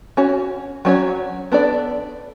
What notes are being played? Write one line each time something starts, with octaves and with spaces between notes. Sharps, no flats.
C#4 F#4 C#5
F#3 C#4 F#4 C#5
B3 D4 A4 D5